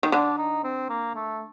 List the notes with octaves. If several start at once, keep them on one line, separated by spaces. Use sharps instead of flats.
D#3
D3 D4
D#4
C4
A#3
A3